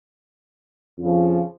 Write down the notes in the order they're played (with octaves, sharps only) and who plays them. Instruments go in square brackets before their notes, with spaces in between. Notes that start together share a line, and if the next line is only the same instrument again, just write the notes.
[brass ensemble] F2 C#3 F3